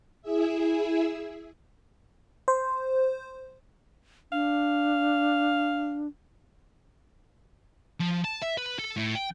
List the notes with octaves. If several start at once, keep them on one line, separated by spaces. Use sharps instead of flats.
E4 G#4 E5
C5
D4 F5
F3
A5
E5
B4
A4
A2
G5